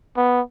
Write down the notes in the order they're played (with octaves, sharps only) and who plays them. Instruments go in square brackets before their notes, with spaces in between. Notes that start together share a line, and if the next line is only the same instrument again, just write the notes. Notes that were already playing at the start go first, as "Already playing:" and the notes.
[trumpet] B3